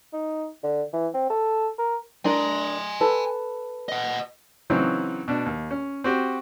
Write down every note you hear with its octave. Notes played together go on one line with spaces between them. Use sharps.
D#4
D3
E3
C4
A4
A#4
D4 A#4 G#5 C6
A4 B4
D#5 F#5
C#3 E3 F#3 C4 C#4 D#4
B2 D4
D#2
C#4
C4 F#4 G4